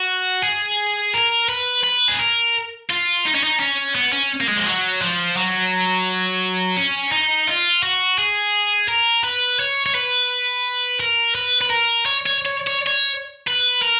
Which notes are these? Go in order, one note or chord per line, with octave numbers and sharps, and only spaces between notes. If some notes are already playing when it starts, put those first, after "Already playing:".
Already playing: F#4
G#4
A#4
B4
B4
G#4
A#4
F4
D#4
C#4
D#4
C#4
B3
C#4
A#3
G#3
F3
F#3
F3
F#3
C#4
D#4
F4
F#4
G#4
A#4
B4
C#5
C#5
B4
A#4
B4
B4
A#4
C#5
C#5
C#5
C#5
C#5
B4
A#4